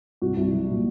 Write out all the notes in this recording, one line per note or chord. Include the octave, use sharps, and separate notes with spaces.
C2 F#4
C2
F#3
A#2